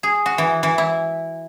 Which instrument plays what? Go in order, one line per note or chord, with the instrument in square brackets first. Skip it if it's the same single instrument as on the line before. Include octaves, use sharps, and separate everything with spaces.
[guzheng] G#4
F#4
E3
E3
E4